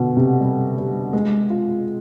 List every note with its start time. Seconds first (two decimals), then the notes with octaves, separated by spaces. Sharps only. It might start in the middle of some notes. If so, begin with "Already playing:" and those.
Already playing: B2 D3
0.17 C3
0.40 G3
0.77 G3
1.13 G#3
1.50 F4